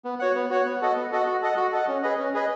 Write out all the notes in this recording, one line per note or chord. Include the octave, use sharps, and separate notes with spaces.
B3
F#4 C#5 F#5
B3
F#4 C#5 F#5
B3
F#4 A4 D#5 F#5
B3
F#4 A4 D#5 F#5
F#4
A4 D#5 F#5
F#4
A4 D#5 F#5
C#4
G#4 B4 D#5
C#4
G#4 B4 D#5